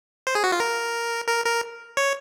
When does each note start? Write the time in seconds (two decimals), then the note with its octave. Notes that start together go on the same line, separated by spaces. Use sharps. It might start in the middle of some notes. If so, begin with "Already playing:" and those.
0.27 C5
0.35 G#4
0.44 F#4
0.52 F4
0.60 A#4
1.28 A#4
1.45 A#4
1.97 C#5